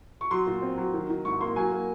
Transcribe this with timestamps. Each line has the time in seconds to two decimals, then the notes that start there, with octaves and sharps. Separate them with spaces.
0.21 C#6
0.31 F#3 C6
0.47 A#2
0.62 C4
0.78 F#3
0.93 D#3
1.09 D#3
1.25 G#2 C#6
1.41 A#3 C6
1.56 F#3 G#5
1.72 A#3